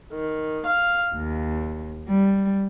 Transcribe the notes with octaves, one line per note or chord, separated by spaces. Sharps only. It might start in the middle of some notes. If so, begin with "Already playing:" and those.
D#3
F5
D#2
G3